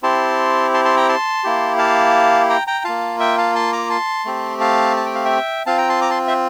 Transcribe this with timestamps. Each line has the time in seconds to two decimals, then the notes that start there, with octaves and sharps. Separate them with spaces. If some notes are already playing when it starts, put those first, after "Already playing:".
0.03 C4 E4 G4 A5 C6
0.74 A5 C6
0.85 A5 C6
0.97 G5 A#5
1.09 A5 C6
1.44 A#3 E4 G4
1.79 F5 A5
2.49 G5 A#5
2.67 G5 A#5
2.84 A#3 F4 F5 A5
3.20 E5 G5
3.38 F5 A5
3.55 A5 C6
3.73 A#5 D6
3.90 A5 C6
4.25 A3 C4 G4
4.61 F5 A5
4.97 A5
5.06 G5
5.15 F5
5.25 E5 G5
5.66 C4 F4 F5 A5
5.78 G5 A#5
5.89 A5 C6
6.01 A#5 D6
6.10 A5 C6
6.28 C5 E5